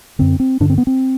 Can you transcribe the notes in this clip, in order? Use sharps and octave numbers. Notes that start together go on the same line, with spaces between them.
F#2 D3 C4
C4
G2 D3 D4
C4
B3
C4